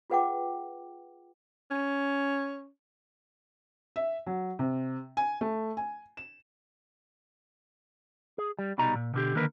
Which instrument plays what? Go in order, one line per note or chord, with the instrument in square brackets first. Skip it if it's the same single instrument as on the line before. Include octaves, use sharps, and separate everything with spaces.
[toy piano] F4 G#4 B4 F#5 G5 D6
[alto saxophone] C#4
[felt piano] E5
F#3
C3
G#5
A3
G#5
E7
[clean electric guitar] G#4
G3
C2 B2 G3 D#4 A#5
A#2
B2 D3 G4
D3 D#3 A#3 A#4 B4